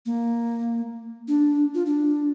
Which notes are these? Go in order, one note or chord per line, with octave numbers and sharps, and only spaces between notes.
A#3
D4
F4
D4